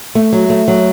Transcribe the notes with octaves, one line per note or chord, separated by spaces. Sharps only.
A3
F#3
A3
F#3